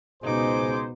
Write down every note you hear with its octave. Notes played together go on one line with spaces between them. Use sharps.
C#2 B2 D#4 G#4 C5 D6